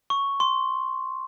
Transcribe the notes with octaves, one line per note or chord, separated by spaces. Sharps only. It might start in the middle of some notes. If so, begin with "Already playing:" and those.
C#6
C6